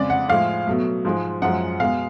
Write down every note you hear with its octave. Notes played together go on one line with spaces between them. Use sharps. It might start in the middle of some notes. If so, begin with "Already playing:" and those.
Already playing: F2 C#3 G#3 D5
F#5
A2 F3 G#3 F5
B2 F#3 A3
G#2 F3 G#3
F#2 F3 G#3 F#5
B2 G#3 F5